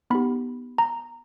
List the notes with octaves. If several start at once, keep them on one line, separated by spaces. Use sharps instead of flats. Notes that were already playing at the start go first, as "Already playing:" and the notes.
B3 D#4 G4 B5
A#5